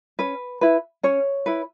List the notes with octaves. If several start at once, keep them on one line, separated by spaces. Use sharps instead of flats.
C#4 B4
E4 B4
C#4 C#5
E4 B4